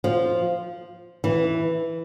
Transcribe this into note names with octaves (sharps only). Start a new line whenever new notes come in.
F3
E3